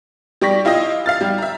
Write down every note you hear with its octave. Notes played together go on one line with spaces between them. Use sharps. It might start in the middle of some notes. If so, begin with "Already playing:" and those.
G3 G4 D5 C#6 A#6 B6
E4 F4 G4 D#5
F5 F6 A6
G3
E5 A#5